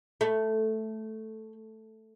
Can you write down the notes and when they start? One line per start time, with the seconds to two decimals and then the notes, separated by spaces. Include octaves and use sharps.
0.21 A3